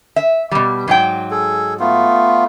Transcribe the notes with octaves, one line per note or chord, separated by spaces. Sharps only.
E5
B2 G3
G#2 F#3 G5
G#4 A4
A3 B3 F4